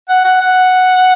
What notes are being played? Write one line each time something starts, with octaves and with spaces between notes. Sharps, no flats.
F#5
F#5
F#5